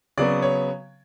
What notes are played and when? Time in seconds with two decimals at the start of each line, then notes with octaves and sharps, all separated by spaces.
0.18 C#3 F#3 B3 D5
0.42 C#5